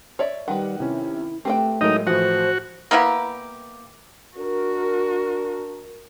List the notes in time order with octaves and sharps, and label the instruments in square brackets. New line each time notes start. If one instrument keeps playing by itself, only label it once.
[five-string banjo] C#5 D5 E5
[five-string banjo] D#3 B4 [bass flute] G3 [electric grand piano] F#5
[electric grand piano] C3 C#4 [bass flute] E4
[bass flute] A3 [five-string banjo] C4 B4 G5 [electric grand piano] G4
[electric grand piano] A2 F#3 G#3 [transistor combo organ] D#4 [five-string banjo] A#4 D#5
[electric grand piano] A2 E3 F3 [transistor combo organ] F#4 [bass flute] C5 [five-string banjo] F#5
[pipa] A#3 B3 E4 G4
[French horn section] D4 A#4 [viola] F#4